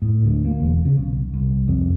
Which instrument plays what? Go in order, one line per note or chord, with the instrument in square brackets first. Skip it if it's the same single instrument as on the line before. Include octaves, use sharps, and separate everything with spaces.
[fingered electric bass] A2
D2
A#3
E1
C#3
B1
C2
F2